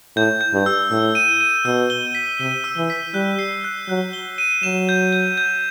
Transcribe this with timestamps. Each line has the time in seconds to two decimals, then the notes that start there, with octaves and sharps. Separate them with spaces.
0.16 A2 G6
0.41 G6
0.54 G2
0.66 E6
0.91 A2 E6
1.15 D#7
1.41 D#7
1.65 B2 E6
1.90 G7
2.15 B6
2.40 C3 D#7
2.64 E6
2.77 E3
2.90 B6
3.14 G3 F#6
3.39 C7
3.64 F#6
3.89 F#3 F#6
4.13 G7
4.38 D#7
4.63 F#3 E7
4.89 G6
5.13 G6
5.38 G6